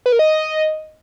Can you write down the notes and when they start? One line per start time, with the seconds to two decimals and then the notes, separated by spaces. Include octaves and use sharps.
0.06 B4
0.12 A#4
0.19 D#5